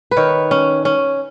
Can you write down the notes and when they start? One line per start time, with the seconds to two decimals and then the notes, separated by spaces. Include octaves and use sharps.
0.11 B4
0.17 D#3 C#5
0.51 C#4
0.85 C#4